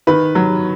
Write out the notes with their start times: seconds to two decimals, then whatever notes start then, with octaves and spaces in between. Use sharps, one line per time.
0.07 D#3 B4
0.35 F#3